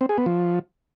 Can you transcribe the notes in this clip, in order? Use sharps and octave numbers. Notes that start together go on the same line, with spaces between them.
C4
G#4
B3
F3